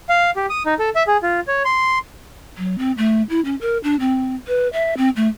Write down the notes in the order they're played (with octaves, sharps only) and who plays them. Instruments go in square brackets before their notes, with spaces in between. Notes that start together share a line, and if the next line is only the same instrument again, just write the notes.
[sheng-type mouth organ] F5
G4
D#6
D#4
A4
E5
G#4
F4
C#5
C6
[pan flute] F#3
C4
A3
E4
C#4
A#4
D4
C4
B4
E5
C4
A3